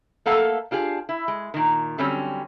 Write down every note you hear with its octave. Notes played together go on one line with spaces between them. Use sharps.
A3 A#3 A4 F5 F#5
D4 F4 G4 G#4
E4
G#3
A#2 D#3
D3 F#3 G3 C4 C#4